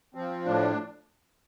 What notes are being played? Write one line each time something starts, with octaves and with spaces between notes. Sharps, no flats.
F3 C4
A2 D4